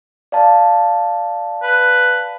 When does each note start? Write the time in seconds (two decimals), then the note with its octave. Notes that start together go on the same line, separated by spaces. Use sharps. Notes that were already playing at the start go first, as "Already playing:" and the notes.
0.32 D5 F5 A5
1.63 B4